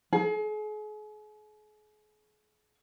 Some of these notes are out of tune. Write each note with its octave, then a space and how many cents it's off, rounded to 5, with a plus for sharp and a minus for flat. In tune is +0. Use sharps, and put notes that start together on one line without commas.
G#4 +40